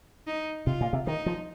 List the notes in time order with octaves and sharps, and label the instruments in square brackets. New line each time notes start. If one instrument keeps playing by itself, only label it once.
[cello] D#4
[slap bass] C3 [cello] F4
[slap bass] A#2
C3
[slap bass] D#3 [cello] D#4
[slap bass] F3